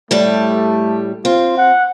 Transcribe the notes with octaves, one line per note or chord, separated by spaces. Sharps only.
A2 G3 A3 G4
C4 F4
F#5